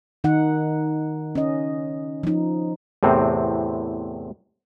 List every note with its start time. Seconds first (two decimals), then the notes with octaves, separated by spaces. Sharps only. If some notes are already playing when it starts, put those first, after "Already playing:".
0.24 D#3 D#4 F#5
1.35 C#4 D#5
2.23 F3 D#4
3.03 E2 A2 C3 C4